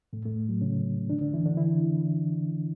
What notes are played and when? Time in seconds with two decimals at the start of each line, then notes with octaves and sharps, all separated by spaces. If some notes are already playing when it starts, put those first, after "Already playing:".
0.13 A2 A3
0.25 A2 A3
0.49 F#3
0.61 C#3 C#4
1.10 D3 D4
1.21 D3 D4
1.34 E3 E4
1.46 D3 D4
1.57 E3 E4